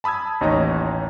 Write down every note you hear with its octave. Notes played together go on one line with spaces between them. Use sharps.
A5 B5 D#6 E6 G#6
A1 D#2 D#4 C#5 D#5 A#5